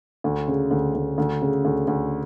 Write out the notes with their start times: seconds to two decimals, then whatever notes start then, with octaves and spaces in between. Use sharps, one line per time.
0.24 D2
0.48 C#3
0.71 D2
0.94 D2
1.18 D2
1.42 C#3
1.65 D2
1.88 D2